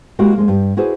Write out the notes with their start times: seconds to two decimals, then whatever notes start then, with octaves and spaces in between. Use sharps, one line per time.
0.19 G#3 A#3 E4 F#4 G4 A#4
0.36 F2 G#3 A#3
0.48 G2 G4
0.77 E4 F#4 G#4 B4 C5 D#5